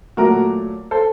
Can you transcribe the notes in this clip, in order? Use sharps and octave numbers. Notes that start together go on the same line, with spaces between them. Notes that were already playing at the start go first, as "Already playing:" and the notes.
A#2 F#3 A3 F#4 A#4
A4 C5